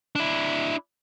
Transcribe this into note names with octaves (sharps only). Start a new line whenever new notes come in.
D4 E4